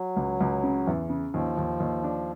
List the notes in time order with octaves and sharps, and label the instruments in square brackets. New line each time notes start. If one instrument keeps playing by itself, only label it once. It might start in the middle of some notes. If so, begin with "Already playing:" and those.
Already playing: [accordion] F#3
[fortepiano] C#2
C#2
C#3
E2
C#3
[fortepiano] D#2 [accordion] F3
[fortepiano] D#2
D#2
D4